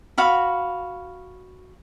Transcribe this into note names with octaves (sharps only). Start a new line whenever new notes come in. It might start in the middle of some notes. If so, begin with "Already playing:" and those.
F#4 F5 B5